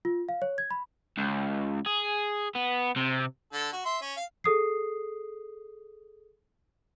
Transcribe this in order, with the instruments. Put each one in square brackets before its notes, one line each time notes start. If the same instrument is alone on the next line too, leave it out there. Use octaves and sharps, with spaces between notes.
[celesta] F4
F5
C#5
G#6
B5
[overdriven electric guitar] C#2
G#4
B3
C3
[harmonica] D3 A4
F#4
E5 C6
C#4
F5
[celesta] G#4 A4 D#6 C7